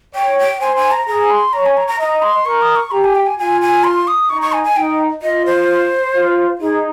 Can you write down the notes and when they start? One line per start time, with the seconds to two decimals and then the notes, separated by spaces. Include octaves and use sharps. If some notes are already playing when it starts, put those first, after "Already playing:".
0.15 C#5 G5
0.39 G5
0.61 C5 G#5
0.76 G#5
0.92 A#5
1.08 G#4 A#5
1.31 C6
1.53 C#5 A#5
1.66 G#5
1.77 A#5
1.88 A#5
2.00 D#5 A#5
2.22 C6
2.46 A#4 C#6
2.62 D#6
2.76 C#6
2.91 G4 A#5
3.04 G#5
3.15 G5
3.26 G#5
3.38 F4 G#5
3.61 G#5
3.84 C6
4.08 D#6
4.30 D#4 C#6
4.42 C#6
4.53 G#5
4.64 G#5
4.77 D#4 G5
5.22 F4 D#5
5.46 C5
6.15 F4
6.60 D#4 G#4